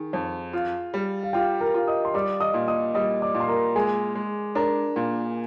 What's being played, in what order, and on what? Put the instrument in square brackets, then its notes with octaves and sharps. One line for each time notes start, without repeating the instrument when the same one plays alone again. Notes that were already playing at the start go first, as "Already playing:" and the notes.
Already playing: [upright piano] D#3 [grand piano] G#4
[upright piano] F2
F4
G3
[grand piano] F5
[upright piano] F4 [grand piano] G4 G5
[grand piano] A#4 A#5
[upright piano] F4
[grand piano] D#5 D#6
C6
[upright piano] G3 [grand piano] D5 D6
[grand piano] D#5 D#6
[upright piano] A#2
[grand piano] D#5 D#6
[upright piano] G3 [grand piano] D#5 D#6
[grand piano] D5 D6
[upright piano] A#2
[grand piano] C6
A#4 A#5
[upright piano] G#3 [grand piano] G#4 G#5
[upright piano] G#3
[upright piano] D4 [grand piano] A#4 A#5
[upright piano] A#2